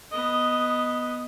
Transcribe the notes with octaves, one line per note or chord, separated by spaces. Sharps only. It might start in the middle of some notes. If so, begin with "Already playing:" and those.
B3 D#5